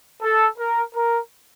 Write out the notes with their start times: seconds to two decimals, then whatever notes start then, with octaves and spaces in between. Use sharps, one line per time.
0.21 A4
0.58 A#4
0.93 A#4